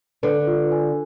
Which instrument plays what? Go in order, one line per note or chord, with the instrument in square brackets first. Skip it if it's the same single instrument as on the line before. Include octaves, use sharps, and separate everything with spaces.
[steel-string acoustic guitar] D3 [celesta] B4
[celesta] F4
G#5